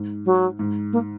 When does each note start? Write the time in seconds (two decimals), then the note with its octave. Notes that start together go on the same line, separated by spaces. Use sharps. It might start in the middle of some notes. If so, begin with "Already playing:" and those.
Already playing: G#2
0.25 F#3
0.59 G#2
0.93 A#3